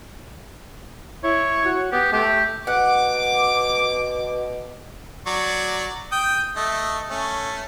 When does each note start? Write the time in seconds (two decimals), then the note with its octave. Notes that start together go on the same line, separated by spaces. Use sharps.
1.24 E4 C#5
1.65 F#4
1.92 B3 G4
2.12 A3 G4
2.67 B2 F#5 D6
5.27 F#3 D5 C#6
6.12 G5 D#6
6.56 A3 D#5
7.10 A3 C#4